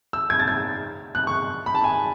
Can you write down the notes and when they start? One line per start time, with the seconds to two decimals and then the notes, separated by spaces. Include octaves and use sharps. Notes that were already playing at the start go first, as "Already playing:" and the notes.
0.13 E6
0.30 G#6
0.40 A6
0.48 G#6
1.15 F#6
1.27 C#6
1.66 B5
1.75 A5
1.84 G#5